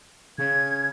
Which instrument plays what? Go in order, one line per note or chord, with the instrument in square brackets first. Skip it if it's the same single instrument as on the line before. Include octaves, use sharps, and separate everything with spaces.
[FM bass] C#3 [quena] G#6